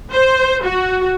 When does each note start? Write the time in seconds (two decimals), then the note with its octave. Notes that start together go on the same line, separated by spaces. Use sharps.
0.12 C5
0.63 F#4